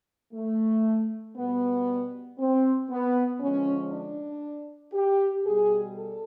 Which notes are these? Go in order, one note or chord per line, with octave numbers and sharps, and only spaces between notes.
A3
B2 G3 B3
C4
B3
D3 F3 G#3 C#4
D4
G4
B2 G3 G#4
A4